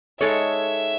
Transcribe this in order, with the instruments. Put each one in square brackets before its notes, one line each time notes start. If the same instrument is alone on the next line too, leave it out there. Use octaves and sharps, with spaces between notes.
[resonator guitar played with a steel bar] G#3 D#4 A4 C#5 [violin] E5